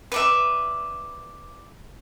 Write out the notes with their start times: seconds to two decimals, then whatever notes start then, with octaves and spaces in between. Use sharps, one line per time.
0.12 B4 D5 E5